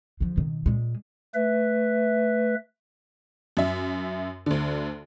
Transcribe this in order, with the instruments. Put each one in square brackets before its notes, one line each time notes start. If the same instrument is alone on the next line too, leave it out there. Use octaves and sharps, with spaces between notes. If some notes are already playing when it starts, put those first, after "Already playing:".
[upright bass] D3 F3
B2 D#3
A#2 G#3
[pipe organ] A3 B4 E5
[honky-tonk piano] F#2 E5
D2 D3